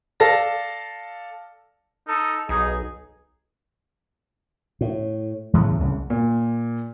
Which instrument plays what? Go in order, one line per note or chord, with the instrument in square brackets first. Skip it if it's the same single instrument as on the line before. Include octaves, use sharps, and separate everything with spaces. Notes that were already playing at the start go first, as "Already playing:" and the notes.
[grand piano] A4 D5 F5 A5 A#6
[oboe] D#4 [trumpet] A4
[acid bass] B1 [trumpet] D#4 [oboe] G#4
[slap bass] A2
E2 A2 C#3 A3
C2 C#3
[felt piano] A#2